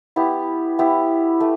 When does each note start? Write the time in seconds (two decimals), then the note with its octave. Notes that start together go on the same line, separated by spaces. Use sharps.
0.16 B3 E4 G4
0.79 B3 E4 G4
1.40 A3